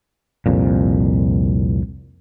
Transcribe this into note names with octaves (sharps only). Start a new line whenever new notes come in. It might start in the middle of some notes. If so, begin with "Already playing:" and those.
C2 F2 A#2